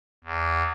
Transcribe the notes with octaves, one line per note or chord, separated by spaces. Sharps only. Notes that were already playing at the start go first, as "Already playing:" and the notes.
E2